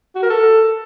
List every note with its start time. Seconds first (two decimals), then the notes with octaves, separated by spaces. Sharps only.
0.16 F#4
0.23 A#4
0.30 A4